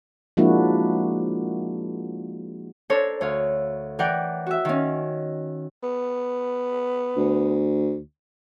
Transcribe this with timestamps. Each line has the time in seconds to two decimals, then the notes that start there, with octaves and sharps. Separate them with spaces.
0.37 F3 G#3 A#3 D4 E4 F#4
2.90 D4 A4 A#4 C5 C#5
3.21 D2 C#5 F5
3.99 E3 A#4 D5 F#5 G5
4.47 F#4 E5
4.65 D#3 C#4
5.83 B3
7.17 D2